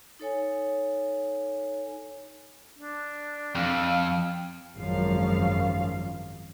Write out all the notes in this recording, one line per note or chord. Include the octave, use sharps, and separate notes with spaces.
D#4 A4 C#5 G#5
D4
F2 F5
G#1 F#2 F3 F5